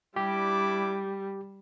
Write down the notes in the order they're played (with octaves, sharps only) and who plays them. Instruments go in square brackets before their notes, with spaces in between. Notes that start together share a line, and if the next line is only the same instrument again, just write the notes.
[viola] G3 [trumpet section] D4 E4 D6 [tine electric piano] G4